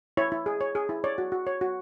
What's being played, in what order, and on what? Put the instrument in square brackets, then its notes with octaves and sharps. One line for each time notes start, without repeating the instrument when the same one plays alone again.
[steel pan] E4 C#5
E4
G#4
C#5
G#4
E4
C#5 D5
F#4
F#4
C#5
F#4